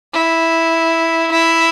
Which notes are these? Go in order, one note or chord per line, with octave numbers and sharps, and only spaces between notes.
E4
E4